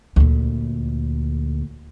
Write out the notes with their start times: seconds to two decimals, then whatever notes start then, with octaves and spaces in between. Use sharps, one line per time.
0.16 D2 A#2